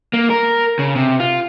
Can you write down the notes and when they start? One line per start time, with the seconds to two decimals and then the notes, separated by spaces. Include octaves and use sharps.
0.13 A#3
0.30 A#4
0.79 C#3
0.96 C3
1.20 F4